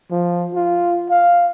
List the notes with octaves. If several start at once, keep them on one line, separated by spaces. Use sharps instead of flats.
F3
F4
F5